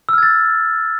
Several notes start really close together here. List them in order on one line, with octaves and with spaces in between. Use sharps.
E6 F6 G#6 A6